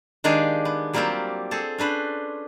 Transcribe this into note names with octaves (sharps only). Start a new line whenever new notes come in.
D#3 G#3 D4 G4 G#4 F5
B3
F#3 G3 A#3 C4 F4 G4
C4 G#4 A4
C#4 D4 B4 C5